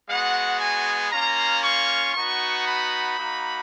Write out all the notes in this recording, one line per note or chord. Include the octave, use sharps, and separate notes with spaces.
G#3 B3 F#4 F#5
G#5
A#3 C#4 F4 A#5
C#6
B3 D#4 F#4 C#6
B5
A#3 D#4 F#4